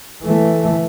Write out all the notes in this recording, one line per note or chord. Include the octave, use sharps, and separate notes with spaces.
E3 A3